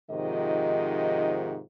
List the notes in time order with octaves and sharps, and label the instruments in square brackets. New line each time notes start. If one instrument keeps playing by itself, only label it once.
[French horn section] G#2 C3 D#3 F3 F4 D#5